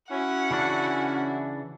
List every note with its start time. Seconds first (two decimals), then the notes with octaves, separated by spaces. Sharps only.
0.11 C#4 E4 F#4 F#5
0.51 C#3 E3 D4